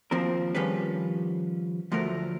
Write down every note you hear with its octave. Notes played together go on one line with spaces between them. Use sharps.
D#2 F3 C4 A#4
D#3 F3 G3 C#4 G#4 B4
D2 F3 F#3 A3 A#4